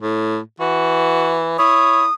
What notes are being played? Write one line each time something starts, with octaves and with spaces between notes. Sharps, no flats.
A2
E3 F#4
E4 C#5 D#6